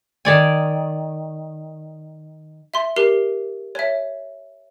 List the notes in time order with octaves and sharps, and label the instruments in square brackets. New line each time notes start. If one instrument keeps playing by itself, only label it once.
[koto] D#3 D5 G#5
[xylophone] E5 C6
G4 A#4 C7
C#5 E5